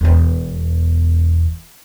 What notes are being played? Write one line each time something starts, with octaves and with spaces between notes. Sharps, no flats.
E1 E2